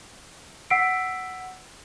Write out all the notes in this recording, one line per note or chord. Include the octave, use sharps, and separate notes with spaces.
F#5 E6 B6 C7 D7